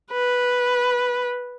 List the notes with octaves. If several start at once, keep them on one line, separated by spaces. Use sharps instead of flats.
B4